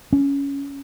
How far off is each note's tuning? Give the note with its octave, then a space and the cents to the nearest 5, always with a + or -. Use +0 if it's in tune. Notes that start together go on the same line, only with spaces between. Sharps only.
C#4 +15